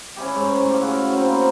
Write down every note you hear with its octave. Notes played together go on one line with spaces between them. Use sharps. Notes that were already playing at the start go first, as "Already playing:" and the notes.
C#4 E4 G4
G#2 C5
A2
G4 A4 F5
C#3 F#4 F5
A#3 C4 E4 B5